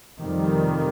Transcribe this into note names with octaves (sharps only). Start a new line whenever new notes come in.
F2 C3 D#3 G3